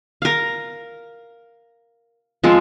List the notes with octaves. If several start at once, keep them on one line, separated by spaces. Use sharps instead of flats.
A#4 F5
F3 G#3 C4